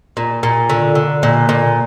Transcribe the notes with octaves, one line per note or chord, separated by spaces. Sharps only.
A#2
A#2
D3
D3
A#2
A#2